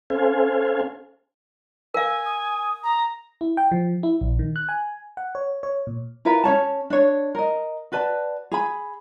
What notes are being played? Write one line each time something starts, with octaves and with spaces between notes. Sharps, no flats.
C#4 A4 C5 F5 G#5
A#4 F5 G#5
D#6
A#5
E4
G5
F3
E4
A#1
D#3
F#6
G#5
F#5
C#5
C#5
A#2
E4 F4 A#4 B4
C#4 D#4 C#5 A5
D4 C#5
A#4 D#5
F#4 B4 D5 A5
G#4 G#5 B5